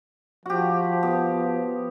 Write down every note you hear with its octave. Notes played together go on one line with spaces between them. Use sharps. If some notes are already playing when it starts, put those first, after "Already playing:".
F3 F#4 G4
B3 G4